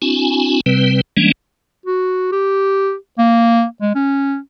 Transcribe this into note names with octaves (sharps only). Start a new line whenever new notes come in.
C4 D4 E4 F#4 G#5
C3 G3 C4 B4
E3 G3 G#3 A#3 C#4 D4
F#4
G4
A#3
G#3
C#4